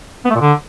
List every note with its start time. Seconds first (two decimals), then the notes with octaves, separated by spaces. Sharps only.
0.25 B3
0.30 A3
0.35 A#2
0.40 D3